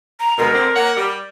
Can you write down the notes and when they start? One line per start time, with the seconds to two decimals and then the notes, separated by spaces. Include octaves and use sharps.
0.20 A#5
0.38 D2 B2 G#3 A#4
0.53 D3 C4
0.75 A#3 C#5 F#5
0.97 G3